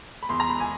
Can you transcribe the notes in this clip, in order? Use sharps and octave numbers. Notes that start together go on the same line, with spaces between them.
B5
E2 C6
A#5
B5
G#5